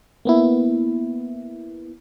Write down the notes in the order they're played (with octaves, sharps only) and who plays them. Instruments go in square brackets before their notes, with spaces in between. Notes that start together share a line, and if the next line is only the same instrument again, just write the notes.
[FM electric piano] A#3 B3 E4